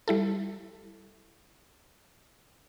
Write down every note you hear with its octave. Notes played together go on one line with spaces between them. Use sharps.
G3 E4 A4